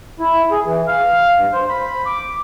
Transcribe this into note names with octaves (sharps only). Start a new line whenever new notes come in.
E4
G#4
E3
F5
G2
C5
B5
D6